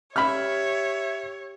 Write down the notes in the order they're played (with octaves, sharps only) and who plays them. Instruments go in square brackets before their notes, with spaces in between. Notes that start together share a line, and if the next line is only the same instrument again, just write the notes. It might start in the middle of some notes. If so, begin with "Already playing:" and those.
[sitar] G4 [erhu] C#5 [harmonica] E5 [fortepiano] B5 F6